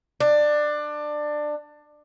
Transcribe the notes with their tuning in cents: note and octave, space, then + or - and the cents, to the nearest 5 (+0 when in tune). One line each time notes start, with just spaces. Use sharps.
D4 +20